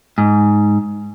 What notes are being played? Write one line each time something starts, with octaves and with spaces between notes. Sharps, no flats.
G#2